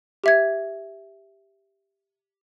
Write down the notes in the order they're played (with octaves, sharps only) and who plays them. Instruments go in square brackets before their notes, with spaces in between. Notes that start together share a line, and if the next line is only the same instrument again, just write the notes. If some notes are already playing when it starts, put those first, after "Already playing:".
[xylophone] G4 E5 G#6